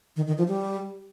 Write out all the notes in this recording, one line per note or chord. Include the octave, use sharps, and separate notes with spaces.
D#3
D#3
F3
G3